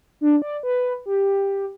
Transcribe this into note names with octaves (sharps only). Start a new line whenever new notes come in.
D4
D5
B4
G4